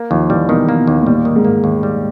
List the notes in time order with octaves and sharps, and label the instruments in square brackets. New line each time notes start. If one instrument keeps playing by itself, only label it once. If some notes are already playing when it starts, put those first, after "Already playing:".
Already playing: [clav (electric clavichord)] A#3
[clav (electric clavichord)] D#2 [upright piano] F3
[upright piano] E3 [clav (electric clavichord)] G3
[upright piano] B2 [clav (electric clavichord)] D#3
[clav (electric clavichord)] A#3
[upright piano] B2
[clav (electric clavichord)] D#2
[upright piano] A2
[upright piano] A#2 [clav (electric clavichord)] G3
[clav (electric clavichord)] D#3
[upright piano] G#2
[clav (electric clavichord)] A#3
D#2
G3